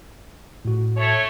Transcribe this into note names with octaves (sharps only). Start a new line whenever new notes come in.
A2 F#4
A3 C#5